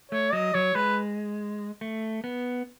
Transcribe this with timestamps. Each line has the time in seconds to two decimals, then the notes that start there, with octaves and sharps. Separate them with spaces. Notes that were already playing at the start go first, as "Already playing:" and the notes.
0.12 A3 C#5
0.33 F#3 D#5
0.54 F#3 C#5
0.75 G#3 B4
1.81 A3
2.24 B3